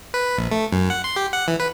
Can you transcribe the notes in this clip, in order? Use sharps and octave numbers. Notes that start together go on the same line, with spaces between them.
B4
A#1
A3
F#2
F#5
C6
G4
F#5
E3
B4